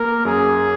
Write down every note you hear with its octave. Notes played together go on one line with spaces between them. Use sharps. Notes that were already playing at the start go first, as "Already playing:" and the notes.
Already playing: A#3 A#4
F#2 G#4